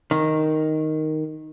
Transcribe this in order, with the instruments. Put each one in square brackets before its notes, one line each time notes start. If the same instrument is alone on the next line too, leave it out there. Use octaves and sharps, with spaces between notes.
[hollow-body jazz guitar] D#3